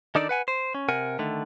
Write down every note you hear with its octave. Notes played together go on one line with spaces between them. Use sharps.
D#3 D4 D#4 A4 D5
B4 F#5 G#5
C5
C#4
C3 A#4 F#5 G#5
D3 D#3 A3